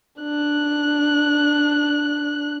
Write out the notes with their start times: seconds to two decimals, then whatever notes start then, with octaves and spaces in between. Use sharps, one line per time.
0.20 D4 F#6